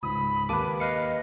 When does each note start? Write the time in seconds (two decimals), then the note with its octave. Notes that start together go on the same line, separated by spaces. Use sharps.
0.03 C#2 G#2 B5 D#6
0.49 D#2 B4 A5 D6 D#7
0.80 B4 D#5 F5 C#7